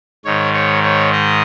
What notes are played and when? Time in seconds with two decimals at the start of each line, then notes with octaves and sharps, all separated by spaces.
0.25 G#2 D#3 C#5
0.54 C#5
0.83 C#5
1.12 D#5